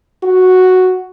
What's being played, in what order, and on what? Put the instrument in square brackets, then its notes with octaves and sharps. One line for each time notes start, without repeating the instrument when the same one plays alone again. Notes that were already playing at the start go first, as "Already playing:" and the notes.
[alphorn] F#4